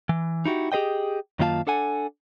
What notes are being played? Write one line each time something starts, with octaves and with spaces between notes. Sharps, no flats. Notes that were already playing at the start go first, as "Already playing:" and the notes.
E3
D#4 E4 F#4 G4
G4 G#4 C5 D#5 G5
F#2 D#3 A#3 F4 F5 A5
D4 A4 F#5 G#5